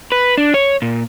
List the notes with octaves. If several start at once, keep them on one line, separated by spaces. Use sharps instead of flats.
B4
D4
C#5
A#2